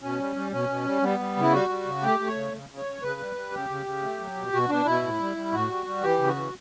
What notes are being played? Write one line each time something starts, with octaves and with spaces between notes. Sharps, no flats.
B2 C#4
G3
G3
B2 C#4
B2
G3
G3 B3
G3
C#3 E4
G3 F#4
G3
C#3
A3 G4
A3
C#5
C#3
C#3
C#3
C#5
C#3
C#3 B4
G3
G3
C#3 G4
C#3
C#3
A3
F#3
B2
B2 F#4
B2 D4
B2 E4
A2
G3
G3
A2 F#4
G3
G3
E3 G4
C#3
F#4
E3